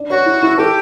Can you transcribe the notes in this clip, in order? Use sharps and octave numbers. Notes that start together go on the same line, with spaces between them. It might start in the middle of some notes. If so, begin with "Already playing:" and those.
Already playing: D4
F#4 C#5
E4
E4
G4 A4